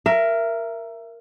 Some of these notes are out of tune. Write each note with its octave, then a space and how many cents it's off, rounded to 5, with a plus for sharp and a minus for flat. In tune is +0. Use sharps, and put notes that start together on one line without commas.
A#4 +0 E5 +25